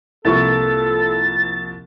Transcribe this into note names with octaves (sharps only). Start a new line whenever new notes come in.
C2 F3 A#3 E4 A4 C#6 A6